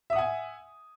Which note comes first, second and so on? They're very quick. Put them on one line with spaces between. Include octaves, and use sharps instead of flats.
E5 D#6 F#5 G#5